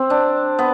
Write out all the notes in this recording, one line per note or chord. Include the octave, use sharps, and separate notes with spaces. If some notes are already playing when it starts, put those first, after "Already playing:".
Already playing: C4
D4
B3